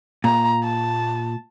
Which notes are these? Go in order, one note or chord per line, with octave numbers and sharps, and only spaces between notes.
A#2 A#5
A5